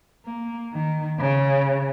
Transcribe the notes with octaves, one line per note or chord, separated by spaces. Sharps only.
A#3
D#3
C#3